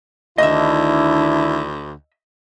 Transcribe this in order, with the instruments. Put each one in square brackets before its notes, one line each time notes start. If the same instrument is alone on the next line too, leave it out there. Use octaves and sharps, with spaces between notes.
[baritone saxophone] D2 [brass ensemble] D#3 D4 E4 [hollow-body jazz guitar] D#5 E5